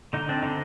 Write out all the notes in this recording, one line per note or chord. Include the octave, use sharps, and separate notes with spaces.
D3 D#4
C4 D4
D3 D#4